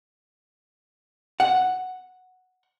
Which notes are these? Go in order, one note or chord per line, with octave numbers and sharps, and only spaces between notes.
F#5